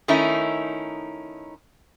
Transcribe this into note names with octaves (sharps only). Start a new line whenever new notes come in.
D#3 A3 C#4 D#4 E4